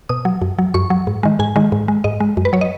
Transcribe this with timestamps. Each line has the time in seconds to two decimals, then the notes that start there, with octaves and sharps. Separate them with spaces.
0.09 B2 D#6
0.25 F#3
0.42 F#2
0.59 F#3
0.74 F#2 C#6
0.90 F#3
1.07 G#2
1.23 D#3 G#3
1.39 G#2 G#5
1.56 D#3 G#3
1.72 G#2
1.88 G#3
2.04 G#2 D#5
2.20 G#3
2.37 F#2
2.45 B4
2.53 F#3 C#5
2.61 D#5